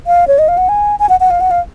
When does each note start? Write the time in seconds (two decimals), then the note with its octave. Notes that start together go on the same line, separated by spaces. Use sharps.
0.07 F5
0.28 C#5
0.39 D#5
0.48 F5
0.58 F#5
0.69 G#5
1.00 G#5
1.09 F#5
1.20 F#5
1.31 F5
1.41 F#5
1.51 F5